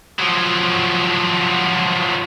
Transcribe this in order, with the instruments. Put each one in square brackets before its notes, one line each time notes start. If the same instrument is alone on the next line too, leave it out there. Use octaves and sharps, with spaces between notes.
[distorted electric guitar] F3 F#3